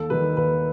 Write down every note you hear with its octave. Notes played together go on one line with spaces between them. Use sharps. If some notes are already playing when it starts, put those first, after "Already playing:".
Already playing: D#2 A4
D#3 G3 B4
D#2 B4